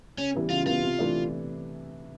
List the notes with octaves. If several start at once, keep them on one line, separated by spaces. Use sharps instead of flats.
C#3 C#4
E3 G3 B3
C#3 F4
E3 G3 B3 F4
C3
E3 A3 D4